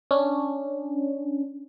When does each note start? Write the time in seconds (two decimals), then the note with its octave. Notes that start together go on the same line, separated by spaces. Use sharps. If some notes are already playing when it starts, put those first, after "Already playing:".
0.11 C#4 D4